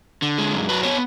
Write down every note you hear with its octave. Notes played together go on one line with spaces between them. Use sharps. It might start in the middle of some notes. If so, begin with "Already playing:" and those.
D3
G#3
F#2
F#3 B4
B3 C#5